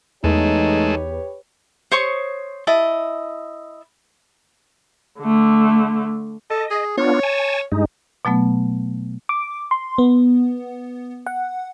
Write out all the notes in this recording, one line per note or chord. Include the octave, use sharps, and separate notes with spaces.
E2 G#3 A3 D#4 G4 B4 C#5
C5 C#5 C#6 D#6
E4 D#5 A5
D3 A3
A4 D#5
G#4
B3 D4 F4 C#5
G#5 A5
G2 G#3 D#4
B2 F#3 A3 B3
D6
C6
B3
F#5